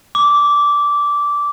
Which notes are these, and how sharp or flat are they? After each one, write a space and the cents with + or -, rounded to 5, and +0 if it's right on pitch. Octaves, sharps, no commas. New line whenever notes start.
D6 -15